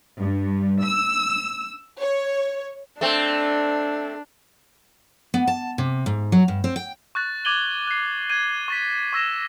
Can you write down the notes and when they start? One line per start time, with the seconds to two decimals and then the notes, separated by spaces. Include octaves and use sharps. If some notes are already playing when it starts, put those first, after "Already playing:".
0.19 G2
0.83 E6
1.99 C#5
3.01 A3 C4 D4
5.34 B3
5.47 A5
5.78 C3
6.06 G#2
6.32 F#3
6.48 G2
6.64 C4
6.76 G5
7.15 C#6 F#6 A6
7.45 D6 G#6 D#7 F#7 G7
7.87 F#6 C7
8.30 G#6 D#7
8.68 C#6 A6 B6
9.13 C#6 E6 A#6 E7